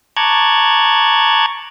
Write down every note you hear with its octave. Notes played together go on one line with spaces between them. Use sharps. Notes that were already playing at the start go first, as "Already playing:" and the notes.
A5 A#5 C#6 D6 F#6 G#6